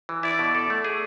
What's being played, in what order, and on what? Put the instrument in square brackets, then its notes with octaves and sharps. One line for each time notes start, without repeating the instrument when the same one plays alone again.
[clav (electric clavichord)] E3
[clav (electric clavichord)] E4 [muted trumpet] D5
[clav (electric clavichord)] B2
[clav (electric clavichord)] A4 [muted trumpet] D5
[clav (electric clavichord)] A3
G#4